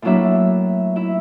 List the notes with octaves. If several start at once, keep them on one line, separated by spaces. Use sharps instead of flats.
A2 F#3 A#3 D4 E4 E5
E4 E5